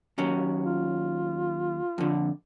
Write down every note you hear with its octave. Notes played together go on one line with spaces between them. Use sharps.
D#2 F#3 C#4
F4
F2 D3